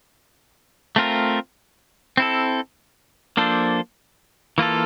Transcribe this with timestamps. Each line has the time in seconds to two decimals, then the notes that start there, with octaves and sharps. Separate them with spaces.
0.96 A3 C4 F4 A#4
2.17 C4 E4 A4
3.37 F3 A#3 D4 A4 C5
4.58 E3 A#3 F4 A4